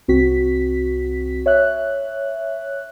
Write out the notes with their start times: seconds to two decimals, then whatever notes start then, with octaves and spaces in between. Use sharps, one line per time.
0.08 C2 C4 F#4 B6
1.46 C#5 E5 F#6